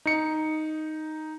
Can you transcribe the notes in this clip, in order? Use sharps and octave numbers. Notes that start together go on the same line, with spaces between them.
D#4 C#7